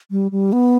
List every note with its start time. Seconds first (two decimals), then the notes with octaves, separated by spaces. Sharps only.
0.11 G3
0.31 G3
0.52 B3